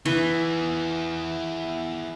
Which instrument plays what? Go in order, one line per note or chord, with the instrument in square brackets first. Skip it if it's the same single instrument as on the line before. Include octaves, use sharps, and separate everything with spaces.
[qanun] E3 [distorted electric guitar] E4 G#4